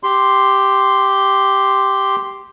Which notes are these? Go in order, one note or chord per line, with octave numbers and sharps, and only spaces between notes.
G4 C6